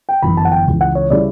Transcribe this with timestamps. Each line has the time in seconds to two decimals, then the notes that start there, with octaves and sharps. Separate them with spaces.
0.09 G5
0.22 G1 F#2 E3 B5
0.37 A5
0.45 F#5
0.52 G5
0.66 C#2 C#3 E3
0.81 F#5
0.95 C#5
1.10 C#3 G3 C#4 E4 D5